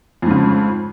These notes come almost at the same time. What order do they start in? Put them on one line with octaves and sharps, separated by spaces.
F2 G#2 C#3